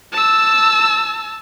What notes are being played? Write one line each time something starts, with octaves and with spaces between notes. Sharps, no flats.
A5 E6